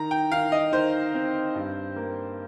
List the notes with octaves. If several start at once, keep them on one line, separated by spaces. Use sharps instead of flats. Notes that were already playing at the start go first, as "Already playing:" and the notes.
Already playing: D#3 A#5
G5
D#3 F5
D#5
D#3 C5
C4
G2
A#3